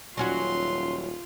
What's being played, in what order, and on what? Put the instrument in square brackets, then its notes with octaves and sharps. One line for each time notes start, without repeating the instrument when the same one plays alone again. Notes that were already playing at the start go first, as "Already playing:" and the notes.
[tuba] D#1 [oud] F#3 C#4 F#4 [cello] F4 [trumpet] C6